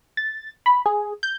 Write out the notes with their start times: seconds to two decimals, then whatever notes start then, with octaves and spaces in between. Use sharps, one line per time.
0.17 A6
0.66 B5
0.86 G#4
1.23 G6